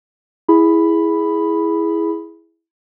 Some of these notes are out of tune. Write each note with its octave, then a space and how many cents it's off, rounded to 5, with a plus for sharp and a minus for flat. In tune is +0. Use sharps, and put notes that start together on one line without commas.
E4 +0 G#4 +0 B5 +0